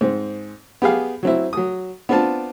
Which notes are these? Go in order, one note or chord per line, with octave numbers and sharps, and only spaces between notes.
G#2 C4
B3 G4 G#4 F5
F#3 C4 E4
F#3 D#6
B3 C4 D4 F4 A5